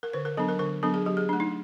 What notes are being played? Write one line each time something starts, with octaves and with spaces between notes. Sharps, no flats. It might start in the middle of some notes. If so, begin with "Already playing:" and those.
A#4
D3 B4
A#4
F#3 B3 D4 A4
A#4
D3 A#4
F#3 B3 D4 A4
G#4
F#3 G4
G#4
A3 D4
D#4